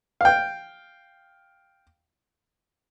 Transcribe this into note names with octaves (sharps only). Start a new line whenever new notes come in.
F5 G5